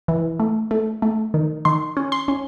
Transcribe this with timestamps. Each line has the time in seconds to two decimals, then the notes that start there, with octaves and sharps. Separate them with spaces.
0.08 E3
0.40 A3
0.71 A3
1.02 A3
1.34 D#3
1.65 D#3 C6
1.97 C#4
2.12 C6
2.28 C#4